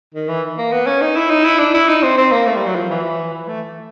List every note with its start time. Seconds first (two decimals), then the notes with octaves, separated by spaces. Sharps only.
0.15 D#3
0.29 E3
0.58 A#3
0.72 B3
0.87 C#4
1.01 D#4
1.16 E4
1.30 D#4
1.45 E4
1.59 D4
1.74 E4
1.89 D#4
2.03 C4
2.18 C4
2.32 A#3
2.46 A3
2.56 G3
2.66 F#3
2.76 F3
2.90 E3
3.33 E3
3.48 A3